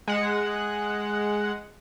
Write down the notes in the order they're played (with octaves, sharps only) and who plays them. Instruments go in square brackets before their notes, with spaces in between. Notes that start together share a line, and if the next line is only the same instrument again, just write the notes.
[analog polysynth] G#3 F#5